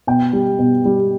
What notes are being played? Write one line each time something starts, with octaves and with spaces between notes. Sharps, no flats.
B2 G5
G3
B2
G3